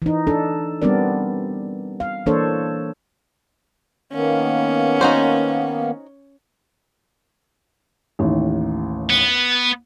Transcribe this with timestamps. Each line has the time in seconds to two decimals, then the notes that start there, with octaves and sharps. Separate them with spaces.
0.02 E3 D#4
0.27 D4 A4
0.82 G3 B3 C4 D4 A#4 D5
2.00 F5
2.26 E3 A#3 D4 A4 C5 C#5
4.13 D#3 A#3 B3 C#4
5.01 D#4 F#4 C5
8.19 A1 D#2
9.10 B3